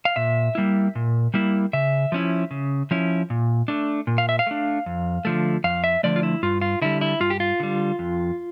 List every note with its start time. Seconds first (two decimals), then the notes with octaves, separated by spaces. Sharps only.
0.05 F5
0.16 A#2 E5
0.55 G3 A#3 E4
0.95 A#2
1.34 G3 A#3 E4
1.73 C#3 E5
2.12 F3 C#4 E4
2.51 C#3
2.91 F3 C#4 E4
3.30 A#2
3.68 A3 D4
4.07 A#2
4.18 F5
4.29 E5
4.39 F5
4.47 A3 D4
4.86 F2
5.25 D3 F3 A3
5.64 F2 F5
5.84 E5
6.03 D3 F3 A3 D5
6.16 F4
6.23 E4
6.43 G2 F4
6.61 F4
6.82 D3 G3 E4
7.01 E4
7.20 G2 F4
7.30 G4
7.40 F4
7.60 D3 G3
7.99 F2